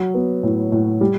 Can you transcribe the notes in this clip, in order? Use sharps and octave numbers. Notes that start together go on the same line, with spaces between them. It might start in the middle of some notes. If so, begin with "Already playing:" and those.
Already playing: F#3
B3
A2
A2
G3